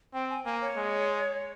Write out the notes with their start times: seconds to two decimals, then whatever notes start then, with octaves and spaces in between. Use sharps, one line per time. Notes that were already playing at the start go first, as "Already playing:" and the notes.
0.13 C4 G5
0.30 G#5
0.45 A#3 G#5
0.61 C#5
0.76 G#3